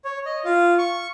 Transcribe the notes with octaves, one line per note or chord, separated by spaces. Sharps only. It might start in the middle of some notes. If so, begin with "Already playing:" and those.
C#5
D#5
F4
C#6